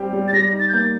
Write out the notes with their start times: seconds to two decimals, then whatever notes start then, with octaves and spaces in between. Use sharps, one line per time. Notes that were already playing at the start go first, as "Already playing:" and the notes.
Already playing: G3 C4 G4
0.13 G3
0.28 A6
0.33 G3 A#6
0.53 D#4
0.60 A6
0.69 G6
0.73 A#3 A6